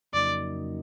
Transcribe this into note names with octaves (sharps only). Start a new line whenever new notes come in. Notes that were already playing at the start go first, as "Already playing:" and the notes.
F2 C#3 F#3 A#3 D#4 D5